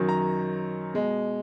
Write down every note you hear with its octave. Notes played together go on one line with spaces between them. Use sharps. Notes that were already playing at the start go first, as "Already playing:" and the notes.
Already playing: F#2 D#3 F#3
A#5
B2 G#3